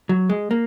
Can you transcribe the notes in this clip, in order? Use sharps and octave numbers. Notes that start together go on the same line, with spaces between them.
F#3
G#3
A#3